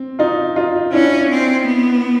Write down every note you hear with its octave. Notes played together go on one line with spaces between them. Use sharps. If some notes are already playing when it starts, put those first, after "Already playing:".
Already playing: C4
D#4 F4
D#4 F4
C#4 D4 E4
C4
B3